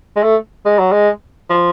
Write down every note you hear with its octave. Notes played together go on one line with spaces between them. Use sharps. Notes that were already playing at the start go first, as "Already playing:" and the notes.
G#3
A3
G#3
F#3
G#3
F3